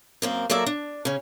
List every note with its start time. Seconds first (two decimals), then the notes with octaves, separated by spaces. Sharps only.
0.22 F#2 A#3 C4
0.50 F#3 A#3 A4 D5 E5 A#5
0.66 D4
1.05 C#3 C#4